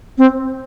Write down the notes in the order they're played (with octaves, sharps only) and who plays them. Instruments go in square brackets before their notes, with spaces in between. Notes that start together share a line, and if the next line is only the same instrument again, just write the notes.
[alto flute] C4